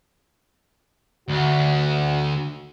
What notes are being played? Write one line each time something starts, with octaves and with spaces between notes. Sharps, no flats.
D2 F#4